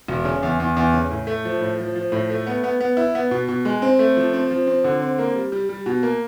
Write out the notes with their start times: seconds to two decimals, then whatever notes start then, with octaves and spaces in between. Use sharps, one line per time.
0.08 E1
0.25 C#3
0.43 E2
0.60 E2
0.77 E2
0.94 C#3
1.10 A2
1.27 A3
1.45 F3
1.61 A2
1.79 F3
1.96 F3
2.12 A2
2.30 A3
2.47 B3
2.64 B3
2.81 B3
2.97 E4
3.15 B3
3.31 B2
3.49 B2
3.65 G#3
3.82 C4
3.99 A3
4.17 F3
4.33 C4
4.51 F3
4.67 C4
4.84 D3
5.01 C4
5.18 A#3
5.35 G3
5.52 G3
5.69 G3
5.86 B2
6.03 A#3